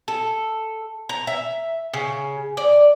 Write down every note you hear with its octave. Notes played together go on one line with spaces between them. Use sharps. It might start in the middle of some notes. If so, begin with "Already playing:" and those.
A4
A#5
E5
C#3
D5